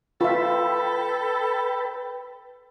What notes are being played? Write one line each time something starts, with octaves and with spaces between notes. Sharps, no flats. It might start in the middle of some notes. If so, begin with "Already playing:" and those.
F4 A4 B4 E5 G5 B5